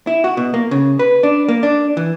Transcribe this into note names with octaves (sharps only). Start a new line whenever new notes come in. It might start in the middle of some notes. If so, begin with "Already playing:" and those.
E4
F#4
B2
A#3
C#3
B4
D4
A#3
D4
E3